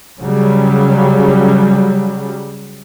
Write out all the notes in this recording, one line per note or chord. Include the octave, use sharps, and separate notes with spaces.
C#3 F#3 G3